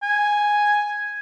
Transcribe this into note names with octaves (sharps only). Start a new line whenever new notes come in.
G#5